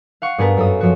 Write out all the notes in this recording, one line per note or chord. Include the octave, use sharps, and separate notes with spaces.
F5 F#5 C#6
G2 B3 G#4 A#4 B4 A5
F#2 A4 D#6
F#2 F3 F#4